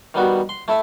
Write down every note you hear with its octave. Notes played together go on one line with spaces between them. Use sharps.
D#3 G3 B3 F#4
C6
A3 E4 A4 E5